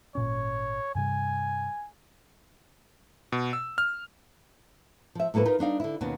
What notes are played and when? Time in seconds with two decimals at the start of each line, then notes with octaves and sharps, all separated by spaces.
0.15 G#1 A#2 C#4 C#5
0.95 G2 C3 G3 G#5
3.32 B2
3.53 E6
3.78 F6
5.15 F3 E5
5.34 A2 F#3 A#3 A4 B4
5.45 D#4 F4 A#4 B4
5.59 G3 D4 D#4 F5
5.80 D3 E4
6.01 D#2 B2 D#3 C#4 F#4 A5